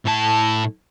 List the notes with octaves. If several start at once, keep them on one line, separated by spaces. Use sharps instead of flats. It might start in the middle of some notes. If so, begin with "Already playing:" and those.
A2 A5